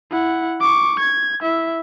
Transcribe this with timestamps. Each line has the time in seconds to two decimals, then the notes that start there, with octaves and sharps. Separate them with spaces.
0.11 E4 F#5
0.61 C#6 D6
1.00 G#6
1.42 E4 E5